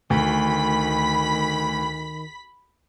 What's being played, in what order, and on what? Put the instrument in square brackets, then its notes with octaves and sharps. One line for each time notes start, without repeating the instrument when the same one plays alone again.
[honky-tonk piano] D2 [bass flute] D#3 [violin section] B5 B6